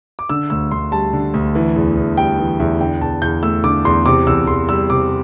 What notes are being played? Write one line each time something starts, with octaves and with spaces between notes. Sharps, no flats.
D6
D3 E6
D2 E6
D2 C6
G3 A5
D3
D2
E3
E2
E2
G3 G5
E3
E2 E5
D3 G5
E2 A5
E2 G6
A3 E6
D3 D6
E2 C6
C3 D6
E2 E6
E2 C6
G3 E6
C3 D6